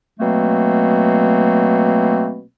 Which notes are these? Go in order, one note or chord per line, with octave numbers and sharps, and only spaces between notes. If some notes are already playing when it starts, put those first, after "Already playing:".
B2 F#3 A3 A#3 C4